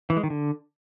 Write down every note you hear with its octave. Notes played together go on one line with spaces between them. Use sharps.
E3
G#3
D#3
D3